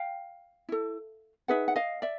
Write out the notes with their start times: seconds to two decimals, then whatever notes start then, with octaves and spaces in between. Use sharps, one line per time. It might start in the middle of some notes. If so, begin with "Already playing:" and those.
Already playing: F5 G5
0.69 E4 A4
1.48 D#4 G#4 B4 E5 F#5
1.68 F#5
1.76 D#5 F5
2.02 D5 E5